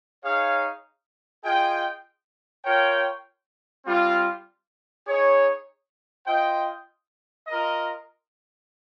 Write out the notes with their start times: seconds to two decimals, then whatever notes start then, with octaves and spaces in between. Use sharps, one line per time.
0.23 D#4 G#4 C#5 F5
1.43 F4 G#4 D#5 G5
2.64 F4 A#4 C#5 G5
3.85 G3 C4 F4
5.06 D#4 G#4 C#5
6.26 F4 C5 D#5 G5
7.47 F4 A#4 D#5